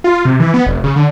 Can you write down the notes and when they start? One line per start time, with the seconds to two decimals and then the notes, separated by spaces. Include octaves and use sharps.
0.04 F4
0.25 C3
0.40 E3
0.54 B3
0.67 F1
0.84 C#3
0.96 D3